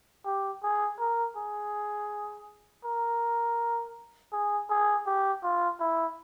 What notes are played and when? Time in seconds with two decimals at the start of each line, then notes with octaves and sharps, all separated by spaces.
0.26 G4
0.63 G#4
1.00 A#4
1.37 G#4
2.85 A#4
4.33 G#4
4.70 G#4
5.07 G4
5.43 F4
5.80 E4